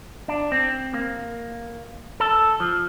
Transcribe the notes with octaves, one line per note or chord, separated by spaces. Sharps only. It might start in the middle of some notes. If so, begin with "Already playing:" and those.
D4
C4
A#3
A4
F3